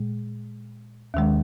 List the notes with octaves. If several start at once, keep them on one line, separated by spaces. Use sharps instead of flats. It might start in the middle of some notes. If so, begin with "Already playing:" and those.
Already playing: A#2 G#3
D#2 D#3 G#3